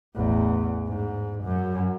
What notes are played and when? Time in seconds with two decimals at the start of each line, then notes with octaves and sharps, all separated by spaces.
0.15 A1 E2
0.88 G#2
1.44 F#2